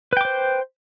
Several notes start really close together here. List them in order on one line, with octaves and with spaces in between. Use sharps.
B4 G5 D6 C5